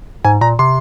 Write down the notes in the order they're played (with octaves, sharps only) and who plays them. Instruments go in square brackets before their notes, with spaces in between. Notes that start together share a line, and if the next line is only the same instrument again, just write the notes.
[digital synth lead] G#2 [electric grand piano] G#5
[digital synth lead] A#2 [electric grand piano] A#5
[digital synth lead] C3 [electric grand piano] C6